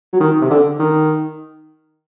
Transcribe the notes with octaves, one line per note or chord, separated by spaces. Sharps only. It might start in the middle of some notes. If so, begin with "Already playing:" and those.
F#3
D#3
C3
D3
D#3